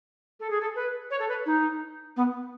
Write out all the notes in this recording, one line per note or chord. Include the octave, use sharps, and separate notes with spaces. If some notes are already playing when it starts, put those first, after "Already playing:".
A4
G#4
A4
B4
C#5
A4
B4
D#4
B3